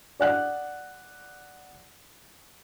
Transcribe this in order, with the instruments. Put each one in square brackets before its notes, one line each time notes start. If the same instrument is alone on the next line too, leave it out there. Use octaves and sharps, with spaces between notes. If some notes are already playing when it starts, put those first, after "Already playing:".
[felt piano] D5 F#5 F#6